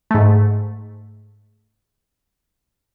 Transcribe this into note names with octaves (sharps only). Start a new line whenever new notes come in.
G#2 A3